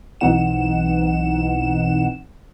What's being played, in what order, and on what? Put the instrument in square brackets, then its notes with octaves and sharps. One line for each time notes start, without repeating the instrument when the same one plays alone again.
[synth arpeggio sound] B1 E3 C4 D#4 F#5 E7